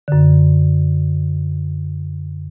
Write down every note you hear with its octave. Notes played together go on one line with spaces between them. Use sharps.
F#2 D3